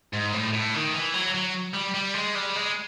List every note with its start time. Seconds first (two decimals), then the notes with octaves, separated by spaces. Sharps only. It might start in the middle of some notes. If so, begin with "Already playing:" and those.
0.14 G#2
0.34 A2
0.53 A2
0.74 D#3
0.93 E3
1.14 F#3
1.35 F#3
1.74 G3
1.95 G3
2.15 G#3
2.35 G3
2.56 G#3